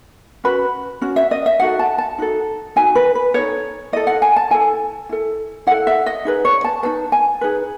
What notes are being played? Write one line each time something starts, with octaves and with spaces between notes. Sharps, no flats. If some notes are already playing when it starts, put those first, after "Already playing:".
C#4 F#4 B4 B5
C#4 F#4
E5
D#5
E5
D#4 F#4 A4 F#5
A5
A5
D#4 F#4 A4
D#4 F#4 G#5
B4
B4
D#4 F#4 A4 C#5
E4 A4 D#5
F#5
G#5
A5
E4 A4 G#5
E4 A4
E4 A4 F#5
E5
D#5
D#4 G#4 B4
C#5
A5
D#4 G#4 B4 A5
G#5
D#4 G#4 B4